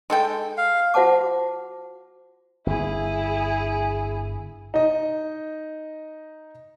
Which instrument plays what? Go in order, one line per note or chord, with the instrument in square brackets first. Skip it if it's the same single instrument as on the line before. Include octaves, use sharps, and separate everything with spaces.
[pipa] G#3 A4 G5
[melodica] F5
[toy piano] F4 F#4 C5 F#5 A5 D6
[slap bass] G1 [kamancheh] E4 G#4
[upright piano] D#4 D#5